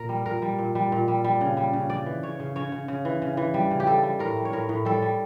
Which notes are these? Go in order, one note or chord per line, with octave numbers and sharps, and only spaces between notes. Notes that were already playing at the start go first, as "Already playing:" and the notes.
Already playing: A#2 A#4
G3
A#2 A#4
G3
A#2
G3
A#2
G3
G3
C#3
G3
C#3
C#3 D5
E3
C#3 C#5
C#3
C#3 C#5
C#3
C#3
E3
C#3
E3
G3
C#3
G4
G3 A4
G3
A2 A#4
G3
C#5
A2 A#4
A2
G3 A4
G3